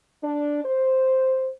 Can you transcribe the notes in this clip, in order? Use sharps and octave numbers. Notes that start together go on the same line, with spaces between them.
D4
C5